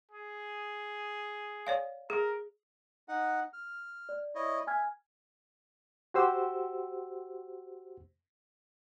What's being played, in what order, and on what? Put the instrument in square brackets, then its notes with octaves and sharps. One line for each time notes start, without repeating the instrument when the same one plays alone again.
[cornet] G#4
[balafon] C#5 D5 F5
[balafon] G#4 [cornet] A#4
[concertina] D#4 F#5
F6
[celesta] D5
[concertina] E4 C#5 D#5
[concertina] E5 [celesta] G#5 F6 G#6
[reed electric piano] F#4 G4 C5 E6